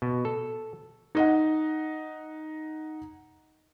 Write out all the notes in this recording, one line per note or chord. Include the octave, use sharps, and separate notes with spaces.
B2
A4
D#4 D#5 F#5